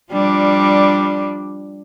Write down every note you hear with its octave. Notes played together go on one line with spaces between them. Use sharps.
F3 G3 D4